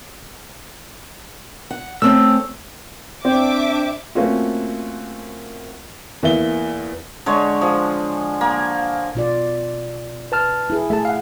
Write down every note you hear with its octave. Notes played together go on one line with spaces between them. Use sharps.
F#5
A3 C4 C#4 E6
C4 D4 E5 D6
A3 A#3 C4 C#4 F4 F#4
E2 A#3 E5 G7
D3 G#3 C#5
F3 G#4
A#3
B2 F4 D5
B4 A5 F6
E4 G#4
A3 G#4 A4 E5 A5
F5 F#5